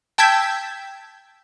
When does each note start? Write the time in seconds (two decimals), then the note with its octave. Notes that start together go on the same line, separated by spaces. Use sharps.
0.18 G5 A5 E6 G6 G#6 B6